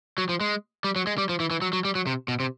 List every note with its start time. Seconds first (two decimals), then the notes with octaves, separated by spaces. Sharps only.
0.18 F#3
0.29 F3
0.41 G#3
0.84 G3
0.96 F#3
1.07 G#3
1.18 G3
1.29 F3
1.40 E3
1.51 E3
1.62 F#3
1.73 F#3
1.85 G3
1.95 F#3
2.07 C3
2.28 B2
2.40 C3